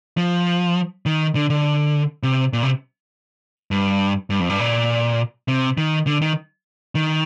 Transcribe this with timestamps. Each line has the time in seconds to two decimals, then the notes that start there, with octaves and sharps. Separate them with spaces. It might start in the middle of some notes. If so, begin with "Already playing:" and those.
0.17 F3
1.06 D#3
1.35 D3
1.50 D3
2.23 C3
2.53 A#2
2.63 C3
3.71 G2
4.30 G2
4.40 F2
4.50 G2
4.59 A#2
5.48 C3
5.78 D#3
6.07 D3
6.22 D#3
6.95 D#3